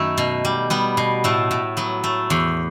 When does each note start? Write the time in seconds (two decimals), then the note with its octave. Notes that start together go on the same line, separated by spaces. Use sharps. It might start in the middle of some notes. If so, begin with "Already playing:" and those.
Already playing: F#2 D#3 A3 E4
0.18 B2
0.45 G3
0.70 G3 B3
0.97 B2
1.24 A2 A3
1.51 A2
1.77 F#3 B3
2.04 A3
2.30 E2